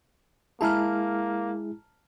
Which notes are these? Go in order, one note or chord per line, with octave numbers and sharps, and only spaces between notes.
G#3 A#3 E4 G#4 A5 A#5 F6